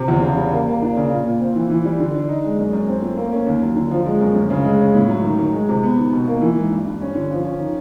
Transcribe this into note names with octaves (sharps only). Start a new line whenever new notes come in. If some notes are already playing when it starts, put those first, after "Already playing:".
Already playing: C3
E2
C#3
G3
A#3
A#3
D4
C#3
A#2
A#2
C4
E3
E3
G3
D3
D4
D#4
G#3
F#2
F#2
C4
A3
A#3
C#4
D#2
F#3
D3
F3
G#3
F#2
D2
C#3
G#3
C#4
A2
F#3
D#3
D#3
G#3
C3
B3
D#3
B2
A#3
E3
G#2
G2
G2
C#4
D3
F3
C#4
D#3